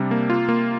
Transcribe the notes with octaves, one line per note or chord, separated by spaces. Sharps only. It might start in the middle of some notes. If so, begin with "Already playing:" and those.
Already playing: C3 G3 D4
A#3
F4
A#3